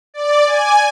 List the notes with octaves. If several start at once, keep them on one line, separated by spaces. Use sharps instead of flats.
D5
G#5